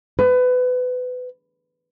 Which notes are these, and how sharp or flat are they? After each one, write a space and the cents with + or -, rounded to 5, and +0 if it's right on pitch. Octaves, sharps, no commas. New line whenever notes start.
B4 +25